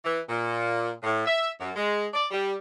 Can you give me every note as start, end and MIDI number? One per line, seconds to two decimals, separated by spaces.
0.05 0.20 52
0.29 0.92 46
1.03 1.25 45
1.26 1.49 76
1.60 1.71 42
1.76 2.07 56
2.13 2.25 74
2.31 2.54 55